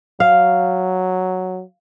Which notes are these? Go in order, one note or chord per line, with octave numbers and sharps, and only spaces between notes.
F#3 F5